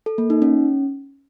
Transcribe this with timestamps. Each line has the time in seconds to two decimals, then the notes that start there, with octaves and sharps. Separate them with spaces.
0.06 A4
0.18 A#3
0.30 D#4
0.42 C#4